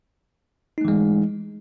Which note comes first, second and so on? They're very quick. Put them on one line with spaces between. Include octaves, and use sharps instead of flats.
D#4 A3 E3 G#3